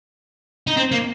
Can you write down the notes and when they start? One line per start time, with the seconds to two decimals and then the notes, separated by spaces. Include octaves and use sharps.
0.67 D#4
0.77 C4
0.91 A#3